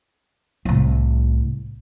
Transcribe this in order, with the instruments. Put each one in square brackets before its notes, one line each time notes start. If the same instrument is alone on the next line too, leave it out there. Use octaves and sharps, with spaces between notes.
[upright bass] C2 A2